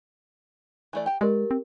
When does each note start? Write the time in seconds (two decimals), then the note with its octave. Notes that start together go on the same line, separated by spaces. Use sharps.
0.93 E3 A3 D5
1.06 G4 G5
1.21 G#3 G4 A#4 D5
1.51 C4